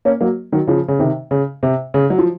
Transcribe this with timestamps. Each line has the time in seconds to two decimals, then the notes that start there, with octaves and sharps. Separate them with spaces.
0.05 A#3 C#4
0.21 F#3 A#3
0.52 D#3 F#3
0.67 C#3 F3
0.88 C#3
0.99 C3 D#3
1.31 C#3
1.63 C3
1.94 C#3
2.10 F#3
2.18 F3